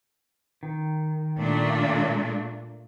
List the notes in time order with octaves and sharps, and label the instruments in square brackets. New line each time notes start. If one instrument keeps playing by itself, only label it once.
[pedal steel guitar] D#3
[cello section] A#2 A3 D4